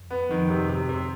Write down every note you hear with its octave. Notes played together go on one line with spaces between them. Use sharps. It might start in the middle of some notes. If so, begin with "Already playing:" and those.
Already playing: F2
B3
F2 D#3
C3
C3
C3